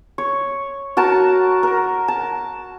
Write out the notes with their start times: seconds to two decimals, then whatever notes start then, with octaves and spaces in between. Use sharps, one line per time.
0.18 C#5
0.97 F#4 A#4 A5
1.63 A#4
2.08 A5